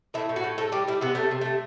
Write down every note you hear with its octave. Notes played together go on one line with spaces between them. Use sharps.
A2 E4
A2
F#4
A2
A2 A4
G3 G4
G3 E4
C3 B3
C3 A3
C3
C3 A3